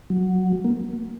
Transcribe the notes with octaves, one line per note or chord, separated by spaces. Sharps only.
F#3
A#3